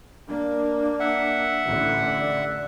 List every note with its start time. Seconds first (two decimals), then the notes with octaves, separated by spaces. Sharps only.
0.28 A#3 D4
1.00 E5 F#5
1.66 A1 D3
2.20 D5